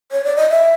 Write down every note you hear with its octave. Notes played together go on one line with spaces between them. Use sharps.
C#5
D5
D#5
E5